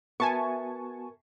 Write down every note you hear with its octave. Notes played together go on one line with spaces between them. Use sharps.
B3 F#4 A#4 B4 E5 G#5 A5 C#6